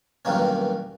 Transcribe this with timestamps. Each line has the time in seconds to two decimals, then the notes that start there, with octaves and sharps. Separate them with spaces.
0.25 B1 E2 G2 D#3 A#3 C#4